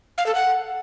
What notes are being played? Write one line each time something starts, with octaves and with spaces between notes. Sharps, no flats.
F5
A4
F#5